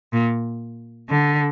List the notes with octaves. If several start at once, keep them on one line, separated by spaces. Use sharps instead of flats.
A#2
D3